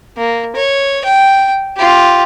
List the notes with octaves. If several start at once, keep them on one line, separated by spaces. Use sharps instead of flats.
A#3
C#5
G5
F4 G4